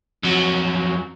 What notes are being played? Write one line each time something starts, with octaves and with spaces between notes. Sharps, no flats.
F2 F#3